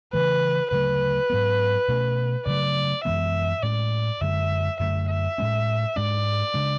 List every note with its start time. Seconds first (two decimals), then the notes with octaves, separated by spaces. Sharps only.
0.13 C#3 E3 A3 B4
0.71 D2 C#3 F#3 A3 B4
1.30 G#2 F#3 B3
1.88 B2 A3 C#4
2.46 D2 C#3 F#3 A3 D5
3.04 F#2 E3 G#3 B3 E5
3.63 A2 G#3 C#4 D5
4.21 F#2 D3 G#3 E5
4.80 F#2 D3 A3 E5
5.09 E5
5.38 A2 G#3 C#4
5.96 G#2 G#3 D4 D5
6.54 C#3 G#3 D4